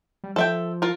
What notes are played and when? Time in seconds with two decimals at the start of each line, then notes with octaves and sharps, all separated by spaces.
0.24 G3
0.36 F3 A4 E5 G5
0.82 F4 A#4